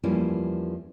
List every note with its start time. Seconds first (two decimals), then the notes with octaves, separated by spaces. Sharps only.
0.04 E2 F3 G3 A#3 C#4 E4